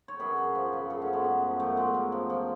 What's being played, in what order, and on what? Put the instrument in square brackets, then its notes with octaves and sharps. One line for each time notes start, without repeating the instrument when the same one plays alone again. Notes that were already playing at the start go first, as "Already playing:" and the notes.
[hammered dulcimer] C#5
F#2 G#4 B4
F#2
F3
C#3
F#2 F#4 A4
A3 C#4
F#2
G#3 B3
F#2
F3
F#2 A3
F#2 G#3
F#2
F3
F3